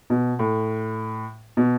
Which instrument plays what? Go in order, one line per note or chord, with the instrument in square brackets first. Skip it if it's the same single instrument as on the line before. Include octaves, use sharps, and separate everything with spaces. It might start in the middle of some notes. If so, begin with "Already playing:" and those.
[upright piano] B2
A2
B2